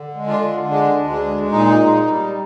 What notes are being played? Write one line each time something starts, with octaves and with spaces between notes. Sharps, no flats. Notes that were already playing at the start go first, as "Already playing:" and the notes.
Already playing: D3
G#3
D4 F4
D3
G#3 D4
D2
D4
G#3
A#2 D#4
A#2
G3